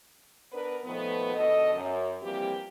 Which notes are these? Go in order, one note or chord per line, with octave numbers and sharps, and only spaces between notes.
B3 D4 A#4 B4
A#2 D#3 F3 A3 B3
G#2 B2 D3 A4 D#5
F#2
E3 F3 G3 A#3 C4 G4